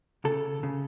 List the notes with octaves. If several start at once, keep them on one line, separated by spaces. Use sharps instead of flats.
C#3 A4
C#3